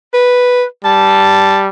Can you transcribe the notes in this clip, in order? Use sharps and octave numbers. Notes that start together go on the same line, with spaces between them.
B4
G3 A5